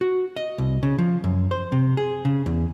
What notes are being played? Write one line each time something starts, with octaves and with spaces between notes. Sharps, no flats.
F#4
D#5
C2
C#3
F3
F#2
C5
C3
G#4
C#3
E2